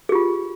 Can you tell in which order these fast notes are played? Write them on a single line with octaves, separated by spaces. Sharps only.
G#4 G4 F4